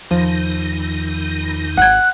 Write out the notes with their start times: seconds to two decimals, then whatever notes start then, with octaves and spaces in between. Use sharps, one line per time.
0.11 E2 D#3 F3 D#4
1.77 G#1 F#5 F#6 G#6